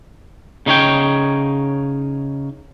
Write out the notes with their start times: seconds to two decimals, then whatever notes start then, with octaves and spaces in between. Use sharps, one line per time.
0.66 C#3 D#4 C#5 G5